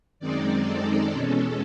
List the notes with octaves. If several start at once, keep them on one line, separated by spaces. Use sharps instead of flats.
F#2 D#3 G#3 C4 D#4 D5
A4
E2 B2 G#3 C#4